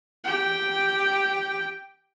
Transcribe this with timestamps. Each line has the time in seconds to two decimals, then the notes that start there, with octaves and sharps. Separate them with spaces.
0.24 G4 G5